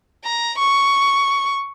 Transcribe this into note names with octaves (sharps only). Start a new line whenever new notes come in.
A#5
C#6